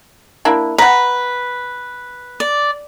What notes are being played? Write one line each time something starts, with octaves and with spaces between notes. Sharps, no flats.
A#3 D4 E4
B4 F#5 A#5
D5